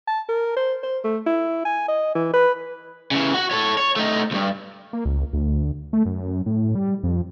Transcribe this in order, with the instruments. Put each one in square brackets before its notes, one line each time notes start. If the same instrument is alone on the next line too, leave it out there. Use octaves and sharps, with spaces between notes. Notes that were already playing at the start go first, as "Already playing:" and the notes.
[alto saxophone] A5
A#4
C5
C5
A3
E4
G#5
D#5
E3
B4
[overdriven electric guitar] C#3 E3
F#4 F#5
A4 C#5
C#5
A3 D#4
C#2 G2
[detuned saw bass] A#3
C#2
D2
A3
F#2
A2
G3
F2